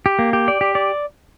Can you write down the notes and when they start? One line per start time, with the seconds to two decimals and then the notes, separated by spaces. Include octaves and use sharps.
0.06 G4
0.19 A#3
0.33 G4
0.48 D5
0.61 G4
0.75 D5